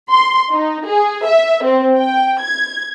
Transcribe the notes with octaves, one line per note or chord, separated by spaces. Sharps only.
C6
D#4
G#4
E5
C4
G5
G#6